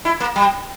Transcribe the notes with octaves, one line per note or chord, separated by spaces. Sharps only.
E4
A#3
G3